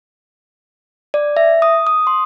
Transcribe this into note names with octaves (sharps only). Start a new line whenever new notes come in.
D5
E5
D#6
D#6
C6